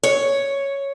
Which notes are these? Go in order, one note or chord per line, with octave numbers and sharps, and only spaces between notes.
C#5